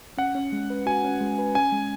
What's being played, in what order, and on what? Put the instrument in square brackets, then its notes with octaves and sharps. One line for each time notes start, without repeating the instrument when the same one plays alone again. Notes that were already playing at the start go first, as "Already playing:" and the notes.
[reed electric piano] C#4 [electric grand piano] F#5
[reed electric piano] C#4
G#3
B4
[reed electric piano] F#4 [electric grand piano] G#5
[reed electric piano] C#4
G#3
B4
[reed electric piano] C#4 [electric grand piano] G#5
[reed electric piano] G#3